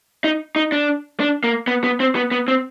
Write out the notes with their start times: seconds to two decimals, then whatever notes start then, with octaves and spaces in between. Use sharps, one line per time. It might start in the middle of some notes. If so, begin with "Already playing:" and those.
0.24 D#4
0.56 D#4
0.72 D4
1.20 D4
1.44 A#3
1.67 B3
1.84 B3
2.00 C4
2.15 B3
2.31 B3
2.48 C4